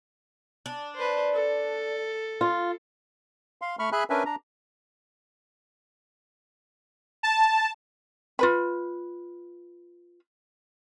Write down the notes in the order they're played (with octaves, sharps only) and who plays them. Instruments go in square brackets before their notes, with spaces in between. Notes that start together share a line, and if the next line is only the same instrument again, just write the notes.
[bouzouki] D4
[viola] B4 C5
A4
[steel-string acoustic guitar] F4
[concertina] F5 C6
A3 B5 C#6 F6
G#4 E5 G#5 B5 F#6
C#4 D4 A#4 B4 E5 G#5
D4 A#5
[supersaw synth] A5
[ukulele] F4 B4 B5